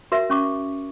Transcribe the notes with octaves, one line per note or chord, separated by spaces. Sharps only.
F#4 A#4 E5
C#4 C#6 D6